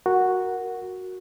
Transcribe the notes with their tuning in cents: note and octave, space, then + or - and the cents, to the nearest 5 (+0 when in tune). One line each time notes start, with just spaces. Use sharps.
F#4 +0 A#4 +0